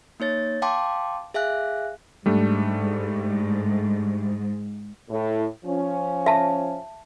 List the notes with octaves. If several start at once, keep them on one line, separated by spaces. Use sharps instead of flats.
A#3 D#4 C#5 A6
F5 G5 A5 C6 D6
G#4 E5 F5 G#5 F#6
G#2 G3 A3 D4
A2
F3 C#4
E5 A5